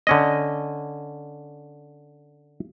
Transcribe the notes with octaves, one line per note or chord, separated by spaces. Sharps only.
D3 C#4 D#5